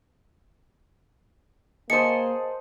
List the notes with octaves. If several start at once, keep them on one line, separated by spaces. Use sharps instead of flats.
A#3 G#4 C5 D#5 A5 D#6 C#7